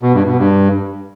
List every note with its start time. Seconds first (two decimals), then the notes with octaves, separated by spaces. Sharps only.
0.02 B2
0.14 G2
0.26 B2
0.38 G2